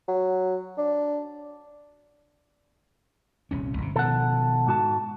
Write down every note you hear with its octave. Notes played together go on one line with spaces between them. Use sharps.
F#3
D4
D#1 C2 C#4
G1 C3
B2 D#3 F3 A4 F#5
G#2 F#4 A5